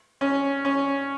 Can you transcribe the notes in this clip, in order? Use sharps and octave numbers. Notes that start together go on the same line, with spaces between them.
C#4
C#4